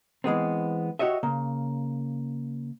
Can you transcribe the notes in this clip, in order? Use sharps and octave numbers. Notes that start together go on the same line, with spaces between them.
E3 G#3 B3 C4
F#4 G4 C#5 D#5 E5
C#3 A#3